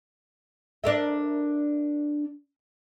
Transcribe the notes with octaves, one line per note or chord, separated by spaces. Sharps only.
D4 A#4 E5